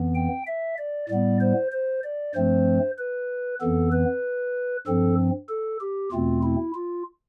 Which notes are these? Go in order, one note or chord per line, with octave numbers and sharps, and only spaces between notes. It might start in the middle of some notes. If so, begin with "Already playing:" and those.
Already playing: F2 E3 B3
G5
E5
D5
A2 G3 B3 D5
C5
C5
D5
G2 F3 A3 C4 C5
B4
F2 E3 B3 A4
B4
G2 F3 C4 A4
A4
G4
E2 B2 A3 C4 F4
E4
F4